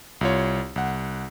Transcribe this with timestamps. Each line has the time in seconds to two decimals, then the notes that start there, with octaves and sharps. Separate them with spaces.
0.21 C2 F4 C#5
0.76 C2 F#5